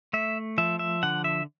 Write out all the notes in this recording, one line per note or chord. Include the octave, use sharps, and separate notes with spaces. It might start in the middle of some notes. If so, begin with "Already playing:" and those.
A3 E5
F3 E5
E5
D3 F#5
E5